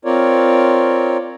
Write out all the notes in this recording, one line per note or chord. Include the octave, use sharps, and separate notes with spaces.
C4 F4 A#4 C#5 D5